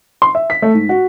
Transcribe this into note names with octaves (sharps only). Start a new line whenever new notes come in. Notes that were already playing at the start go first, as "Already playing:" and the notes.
C6
E5
B6
A3
G#2
F#4